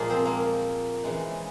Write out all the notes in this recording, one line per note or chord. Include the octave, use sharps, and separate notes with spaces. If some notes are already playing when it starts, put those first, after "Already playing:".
Already playing: A#2 F3 G#3 A#3 F4 G#4
C4
A#3
C#3 E3 G#3